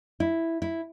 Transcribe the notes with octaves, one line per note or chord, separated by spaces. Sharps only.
E4
E4